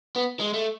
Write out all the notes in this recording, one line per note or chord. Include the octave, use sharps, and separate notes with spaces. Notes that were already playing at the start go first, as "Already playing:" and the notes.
B3
G#3
A3